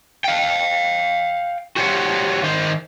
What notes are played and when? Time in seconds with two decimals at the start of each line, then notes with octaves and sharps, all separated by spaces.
0.24 F5 G5
1.76 F#4 G4 C5 C#5 F#5
2.43 D#3 C5